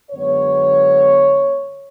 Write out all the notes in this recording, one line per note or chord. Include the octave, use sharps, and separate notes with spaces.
F#2 D3 G#3 B3 C#5